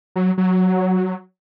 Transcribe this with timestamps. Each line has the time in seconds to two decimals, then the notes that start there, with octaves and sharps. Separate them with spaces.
0.16 F#3
0.38 F#3